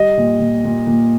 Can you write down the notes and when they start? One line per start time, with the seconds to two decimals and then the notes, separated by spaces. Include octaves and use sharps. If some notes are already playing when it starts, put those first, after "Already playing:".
Already playing: G3 D#5
0.17 A#2
0.40 A#2
0.65 A#2
0.87 A#2